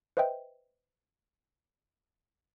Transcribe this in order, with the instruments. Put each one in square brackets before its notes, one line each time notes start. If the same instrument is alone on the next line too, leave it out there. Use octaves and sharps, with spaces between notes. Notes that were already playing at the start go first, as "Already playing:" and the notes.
[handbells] B4 C5 D#5 E5 G5